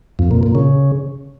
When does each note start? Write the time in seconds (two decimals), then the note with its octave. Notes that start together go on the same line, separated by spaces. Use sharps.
0.19 F2
0.31 A#2
0.43 A#2
0.55 C#3